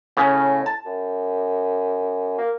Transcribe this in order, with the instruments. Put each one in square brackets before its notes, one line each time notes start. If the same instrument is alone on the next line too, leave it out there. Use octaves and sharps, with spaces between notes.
[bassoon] A2 [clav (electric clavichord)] C#3
[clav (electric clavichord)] A5
[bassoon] F#2
A#3